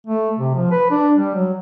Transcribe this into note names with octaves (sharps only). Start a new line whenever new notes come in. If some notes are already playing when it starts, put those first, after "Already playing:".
A3
C3
F3
B4
D4
G3
F#3